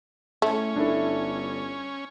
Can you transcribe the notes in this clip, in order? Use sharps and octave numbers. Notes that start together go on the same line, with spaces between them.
A2 A3 C#4
G1 D4 E4 A4